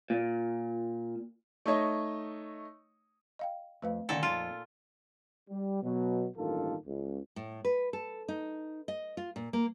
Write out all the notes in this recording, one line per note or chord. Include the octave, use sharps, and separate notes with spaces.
A#2
A3 D#4 C#5 D#5
D#5 F5 G5
F2 A3 B4 F5
A#2 D3 D#3 C#4 D#4 A4 F#5
F2 E3 F4 A5
G3
B2 F#3
A1 G2 D#3 A#3 F4 A4
C#2
A2
B4
A4
D#4
D#5
F4
A#2
A#3